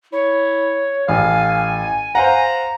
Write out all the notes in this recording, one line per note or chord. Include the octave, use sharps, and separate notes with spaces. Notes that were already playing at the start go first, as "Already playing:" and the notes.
E4 C#5
A1 A2 F5 G#5
C5 F5 F#5 A#5